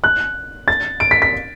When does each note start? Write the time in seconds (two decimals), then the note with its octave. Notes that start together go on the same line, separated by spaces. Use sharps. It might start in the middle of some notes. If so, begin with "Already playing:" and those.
0.04 F#6
0.68 A6
1.00 D7
1.11 B6
1.22 B6